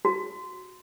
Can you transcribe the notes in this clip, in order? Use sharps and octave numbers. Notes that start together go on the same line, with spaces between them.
F#4